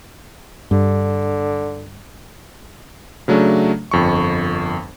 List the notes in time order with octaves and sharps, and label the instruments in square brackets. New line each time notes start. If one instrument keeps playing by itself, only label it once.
[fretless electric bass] G2 [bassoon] D3
[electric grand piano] C#3 F#3 A3 D4
G1 F2 C#6